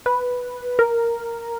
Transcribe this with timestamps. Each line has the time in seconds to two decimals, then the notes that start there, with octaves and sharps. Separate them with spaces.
0.06 B4
0.79 A#4